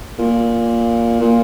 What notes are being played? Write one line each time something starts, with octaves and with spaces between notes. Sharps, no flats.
A#2
A#2